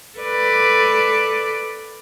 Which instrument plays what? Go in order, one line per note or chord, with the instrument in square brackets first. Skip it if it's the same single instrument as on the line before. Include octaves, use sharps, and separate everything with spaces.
[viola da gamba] A4 B4 D5